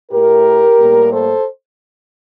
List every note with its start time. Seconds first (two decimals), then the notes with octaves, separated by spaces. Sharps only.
0.11 A2 A3 G4 A#4
0.79 A2 G3 A#3
1.12 A4 C5